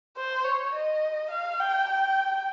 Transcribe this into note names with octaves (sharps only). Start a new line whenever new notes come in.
C5
C#5
D#5
F5
G5
G5